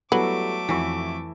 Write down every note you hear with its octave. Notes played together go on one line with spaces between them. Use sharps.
F#3 G3 A3 B3 E4 A4 D6
F2 E3 E4 F#4 C#6